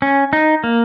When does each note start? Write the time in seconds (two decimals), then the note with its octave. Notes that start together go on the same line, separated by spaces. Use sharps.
0.02 C#4
0.33 D#4
0.64 A#3